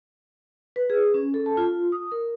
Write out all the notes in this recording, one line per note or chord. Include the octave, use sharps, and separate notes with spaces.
B4
G#4
C#4
A4
A5
F4
D#6
A#4